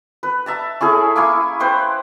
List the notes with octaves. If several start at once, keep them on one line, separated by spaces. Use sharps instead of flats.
B4
E5 A5 A#5
C#4 E4 G#4 A4
A#3 E4 G#5 C#6
B4 C5 G5